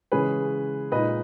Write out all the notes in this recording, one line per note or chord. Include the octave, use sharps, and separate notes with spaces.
C#3 E3 G#3 C#4 G#4 B4
A#2 G#3 D#4 B4 D#5